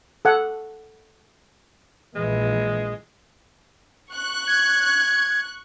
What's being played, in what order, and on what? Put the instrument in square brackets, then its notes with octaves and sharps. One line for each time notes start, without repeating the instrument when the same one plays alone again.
[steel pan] A4 F#5
[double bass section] A#1 E3 [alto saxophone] G#3
[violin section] C#6 F#6
[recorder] G#6